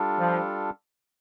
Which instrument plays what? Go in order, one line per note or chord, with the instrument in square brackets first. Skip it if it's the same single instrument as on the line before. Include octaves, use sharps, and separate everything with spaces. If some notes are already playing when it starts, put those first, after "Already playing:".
Already playing: [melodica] G3 D4 F4 A4
[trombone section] F3